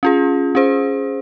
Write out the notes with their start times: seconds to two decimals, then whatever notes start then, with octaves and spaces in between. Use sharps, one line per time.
0.03 C#4 F4 G#4
0.55 C#4 G#4 C5